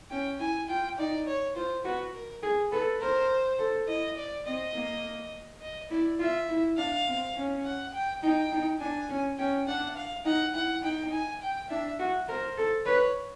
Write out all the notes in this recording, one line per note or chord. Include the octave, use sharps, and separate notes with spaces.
C#4 G5
E4 G#5
F4 G5
D#4 D5
C#5
F4 C5
F#4 B4
A#4
G#4
A4 B4
A#4 C5
A4
E4 D#5
D5
C4 D#5
A#3
D#5
E4 D5
F4 E5
E4
D4 F5
C4
C#4
F#5
G5
D#4 G5
D#4
D4 G#5
C#4
C#4 G5
D4 F#5
F5
D#4 F#5
E4 F#5
D#4 G5
G#5
G5
D4 E5
F#4
A#4 C5
A4
B4 C#5